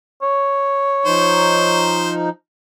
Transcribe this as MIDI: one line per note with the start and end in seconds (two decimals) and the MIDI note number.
0.22 2.02 73
1.06 2.29 53
1.06 2.29 63
1.06 2.12 72